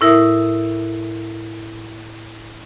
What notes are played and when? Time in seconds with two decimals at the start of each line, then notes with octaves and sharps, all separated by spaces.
0.01 A2 E4 A#4 E5 D#6